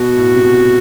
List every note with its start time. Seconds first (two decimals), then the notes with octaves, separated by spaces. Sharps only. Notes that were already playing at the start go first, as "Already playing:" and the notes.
Already playing: B2 F#4
0.16 A2
0.34 C3
0.43 B2